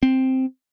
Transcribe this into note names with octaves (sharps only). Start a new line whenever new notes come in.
C4